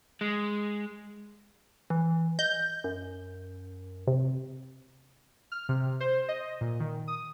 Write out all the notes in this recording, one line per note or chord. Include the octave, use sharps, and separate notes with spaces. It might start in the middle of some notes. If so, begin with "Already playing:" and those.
G#3
E3
D#5 G6
F#2
C3
F6
C3
C5
D#5
A#2
D#3
D#6